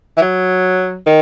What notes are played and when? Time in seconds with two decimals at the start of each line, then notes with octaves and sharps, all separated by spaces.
0.18 E3
0.22 F#3
1.07 D#3